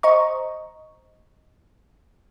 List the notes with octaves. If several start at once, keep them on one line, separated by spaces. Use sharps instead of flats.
C5 D#5 A#5 C#6